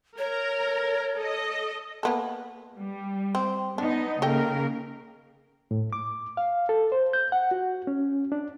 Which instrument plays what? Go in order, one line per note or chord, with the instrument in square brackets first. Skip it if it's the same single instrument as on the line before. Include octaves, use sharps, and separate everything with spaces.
[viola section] A#4 [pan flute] C#5
[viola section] A4 D#5
[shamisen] A#3 B3 A4
[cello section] G3
[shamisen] C4
[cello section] B3 D#4 [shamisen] D4
[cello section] C#3 A#3 A#4 [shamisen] A4 D#5 G5
[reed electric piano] A2
D6
F5
A4
C5
G6
F#5
F#4
C#4
D4